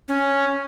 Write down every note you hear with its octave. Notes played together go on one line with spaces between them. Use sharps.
C#4